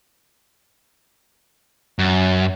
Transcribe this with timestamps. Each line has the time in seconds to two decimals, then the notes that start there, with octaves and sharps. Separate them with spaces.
1.99 F#2